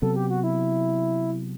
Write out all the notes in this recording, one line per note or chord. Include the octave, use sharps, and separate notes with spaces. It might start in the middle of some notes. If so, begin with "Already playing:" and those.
C3 F#3 B3 A4
G4
F#4
E4